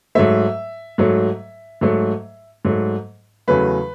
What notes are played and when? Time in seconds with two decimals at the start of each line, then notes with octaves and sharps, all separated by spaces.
0.15 G#2 F#3 A3 E5
0.98 G#2 F#3 A3
1.81 G#2 F#3 A3
2.65 G#2 F#3 A3
3.48 E2 C#3 F#3 A3 B4